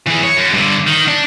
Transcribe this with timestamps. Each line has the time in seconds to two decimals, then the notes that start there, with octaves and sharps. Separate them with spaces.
0.07 E3 G#4
0.23 C#5
0.37 F#2
0.54 G2 D3
0.87 D#3
1.08 D4